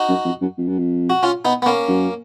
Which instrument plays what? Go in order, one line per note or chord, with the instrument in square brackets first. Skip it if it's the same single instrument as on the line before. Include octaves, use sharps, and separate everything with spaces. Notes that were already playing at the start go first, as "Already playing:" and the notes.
Already playing: [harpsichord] D#4 F#4
[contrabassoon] F#2
F2
F#2
F2
F#2
F2
[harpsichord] F#4
C#4 F4
B3 D#4
B3
A#3 C#4
[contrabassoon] F#2